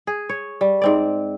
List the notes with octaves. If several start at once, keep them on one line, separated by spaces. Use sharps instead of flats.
G#4
C#5
G3
G#2 C4 D5